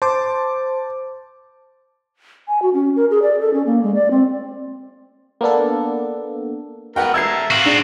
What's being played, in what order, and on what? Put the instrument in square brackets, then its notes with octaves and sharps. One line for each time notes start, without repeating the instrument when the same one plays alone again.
[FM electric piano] C5 [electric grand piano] A5 D6
[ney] G#5
F#4
C#4
A#4
G#4
D5
A4
C#4
A#3
G#3
D5
C4
[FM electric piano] A#3 B3 D4 A4
[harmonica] B3 F#4 A#4 [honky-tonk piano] F#5 G5
[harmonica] E5 A5 A#5 [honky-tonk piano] E6 G#6 C7
[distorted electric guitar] C4 F#4 [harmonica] F5
[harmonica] G#3 [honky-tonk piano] D4